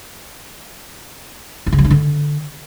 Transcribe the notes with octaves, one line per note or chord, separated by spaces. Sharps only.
C4
C#3
F#3
D4
D3